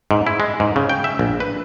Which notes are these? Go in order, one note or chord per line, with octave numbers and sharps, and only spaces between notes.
G#2
E4
G#3
G#2
C#3
G5
E5
A#1
B4